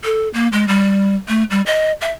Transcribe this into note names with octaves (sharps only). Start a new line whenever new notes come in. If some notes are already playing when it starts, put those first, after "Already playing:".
A4
A#3
G#3
G3
A3
G3
D#5
E5